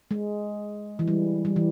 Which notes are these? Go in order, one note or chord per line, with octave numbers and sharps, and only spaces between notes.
G#3
E3
G3
G3
E3